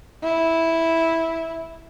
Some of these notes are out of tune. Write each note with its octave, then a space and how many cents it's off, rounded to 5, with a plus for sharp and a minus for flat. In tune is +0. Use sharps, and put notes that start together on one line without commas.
E4 -5